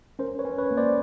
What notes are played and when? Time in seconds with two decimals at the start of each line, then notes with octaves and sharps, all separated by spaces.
0.19 C#4 A#4 C5
0.39 B4 C#5
0.45 C#4
0.58 B4 C#5
0.71 A#3
0.77 C5 D5